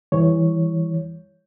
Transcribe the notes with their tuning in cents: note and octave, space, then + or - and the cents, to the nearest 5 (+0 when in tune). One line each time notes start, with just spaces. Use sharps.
E3 +0 G3 +30 C#5 +0